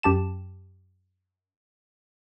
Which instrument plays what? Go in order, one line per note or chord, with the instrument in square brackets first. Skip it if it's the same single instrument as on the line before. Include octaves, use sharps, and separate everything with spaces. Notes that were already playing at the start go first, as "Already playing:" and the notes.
[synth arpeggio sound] F#2 G4 A5 E7